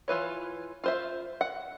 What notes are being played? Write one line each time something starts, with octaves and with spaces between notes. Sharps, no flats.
E3 F4 B4 C#5
F4 C5 E5
F#5